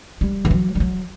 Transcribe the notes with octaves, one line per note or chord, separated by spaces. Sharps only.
G3
E3
F#3
G3
F#3